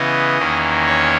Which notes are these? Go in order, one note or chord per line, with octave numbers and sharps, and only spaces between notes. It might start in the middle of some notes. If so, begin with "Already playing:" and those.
Already playing: C#3 E3 B3 D#5
E2 D#3 A#3 C#4
C#5